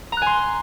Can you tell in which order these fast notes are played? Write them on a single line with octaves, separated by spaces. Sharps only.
A#5 F#6 G#5 C6